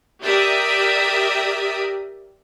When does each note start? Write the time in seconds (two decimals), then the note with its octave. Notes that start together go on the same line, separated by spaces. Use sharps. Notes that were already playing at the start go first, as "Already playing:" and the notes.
0.21 G4 A#4 D5 E5 D#6